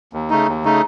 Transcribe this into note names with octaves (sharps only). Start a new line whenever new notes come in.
D#2
C#3 A3 D#4
D#2
C#3 A3 D#4